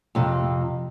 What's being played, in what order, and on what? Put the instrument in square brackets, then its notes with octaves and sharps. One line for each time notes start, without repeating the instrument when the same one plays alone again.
[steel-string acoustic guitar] F2 C3